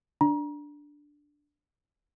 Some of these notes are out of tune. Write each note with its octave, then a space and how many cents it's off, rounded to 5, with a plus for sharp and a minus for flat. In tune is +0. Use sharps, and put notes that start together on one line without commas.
D4 +0 A#5 +30